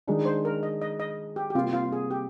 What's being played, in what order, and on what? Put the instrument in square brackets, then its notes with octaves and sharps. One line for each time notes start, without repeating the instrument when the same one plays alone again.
[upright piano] D#3 G#3 D4 [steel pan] D#4
[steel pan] C5
A#4
D#5
D#5
D#5
G4
G4
[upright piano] C3 G3 A#3 [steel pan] F4
[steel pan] F4
G#4
G4